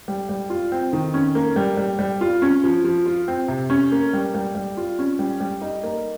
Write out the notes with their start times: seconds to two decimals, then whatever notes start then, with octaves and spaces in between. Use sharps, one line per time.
0.08 G3
0.29 G3
0.50 F4
0.72 C4
0.93 D#3
1.14 C#4
1.35 A#3
1.56 G3
1.77 G3
1.99 G3
2.21 F4
2.42 C#4
2.64 F3
2.84 F3
3.06 F4
3.28 C4
3.48 C3
3.70 C#4
3.92 A#3
4.13 G3
4.35 G3
4.55 G3
4.77 F4
4.99 C#4
5.19 G3
5.40 G3
5.62 D#4
5.83 A#3